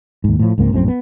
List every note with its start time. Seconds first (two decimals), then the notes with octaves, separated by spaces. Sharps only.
0.24 D#2 G#2
0.39 A2 F3
0.58 C#2 G#2 A#3 C4
0.73 A#1 F#2 A2 C4
0.88 B3